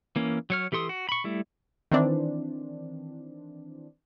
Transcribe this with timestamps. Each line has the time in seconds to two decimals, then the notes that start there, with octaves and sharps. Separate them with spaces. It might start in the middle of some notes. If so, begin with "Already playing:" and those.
0.16 E3 A#3 C#4
0.50 F#3 C#5 F6
0.72 E3 G4 A4 C6 D#6
0.89 F#4
1.09 B5 C#6
1.24 G3 A3 E4
1.91 D#3 E3 C4 D4